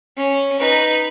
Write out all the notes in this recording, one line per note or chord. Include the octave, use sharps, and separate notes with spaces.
C#4
D#4 B4